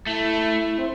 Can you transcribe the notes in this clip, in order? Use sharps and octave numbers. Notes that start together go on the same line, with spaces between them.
A3 E4
C4